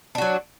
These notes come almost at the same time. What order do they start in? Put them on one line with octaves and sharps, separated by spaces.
D4 F#4 F#3